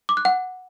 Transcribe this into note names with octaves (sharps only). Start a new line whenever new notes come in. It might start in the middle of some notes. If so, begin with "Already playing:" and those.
D6
F#6
F#5